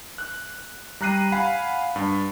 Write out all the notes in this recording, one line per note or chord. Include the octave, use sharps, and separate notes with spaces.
F#6
G3 A#5 F#6 C7 D#7
F5 F#5 G#5 B5 C7 D#7
G2